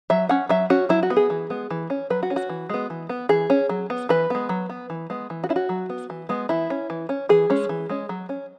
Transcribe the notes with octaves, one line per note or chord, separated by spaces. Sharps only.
F#3 E5
C#4 F#5
F#3 E5
C#4 F#4
F#3 E4
F#4
B3
G#4
E3
G#3 B3
E3
C#4
F#3 B4
F#4
C#4
F#4
E3
G#3 B3
E3
B3
E3 G#4
C#4
F#3
B3
E3 B4
G#3 B3
F#3
B3
E3
G#3 B3
E3
F#4
C#4 E4
F#4
F#3
B3
E3
G#3 B3
E3 E4
C#4
E3
C#4
E3 G#4
G#3 C#4
E3
G#3 C#4
F#3
C#4